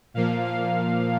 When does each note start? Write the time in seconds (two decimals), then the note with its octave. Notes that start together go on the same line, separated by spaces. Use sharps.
0.14 A#2 F3 A#3 F5
0.45 F5